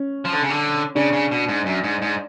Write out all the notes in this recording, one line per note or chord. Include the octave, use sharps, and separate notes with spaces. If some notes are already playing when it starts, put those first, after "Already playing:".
Already playing: C#4
F3
D3
C#3
D3
C#3 D4
C#3
B2
G#2
F#2
G#2
G#2